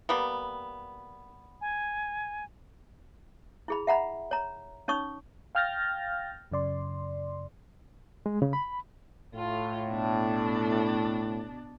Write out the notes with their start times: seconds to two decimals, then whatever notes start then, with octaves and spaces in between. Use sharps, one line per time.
0.09 G3 A#3 B3
1.61 G#5
3.68 E4 G#4 B5
3.87 E5 F#5 A#5 B5
4.31 C#5 A#5
4.88 C#4 D#4 C#5 C#6 D#6
5.55 F5 G5 F6 G6 A6 A#6
6.51 F#2 C#3 D5 C6
8.26 G#3
8.42 C#3
8.53 B5
9.34 A2 F4
9.90 B2 D4